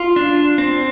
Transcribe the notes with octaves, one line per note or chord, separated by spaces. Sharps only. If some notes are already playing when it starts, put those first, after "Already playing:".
Already playing: F4
D4
C4